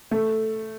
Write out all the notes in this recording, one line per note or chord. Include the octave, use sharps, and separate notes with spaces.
A3